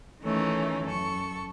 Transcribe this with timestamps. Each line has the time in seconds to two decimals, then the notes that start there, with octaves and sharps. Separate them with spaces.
0.22 D#3 E3 A3 C#4 D#4
0.86 F#2 A4 C#6